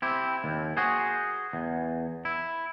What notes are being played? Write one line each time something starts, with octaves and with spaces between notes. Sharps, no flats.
C4 E4 G4
D#2
F#4 G#4 C5
E2
E4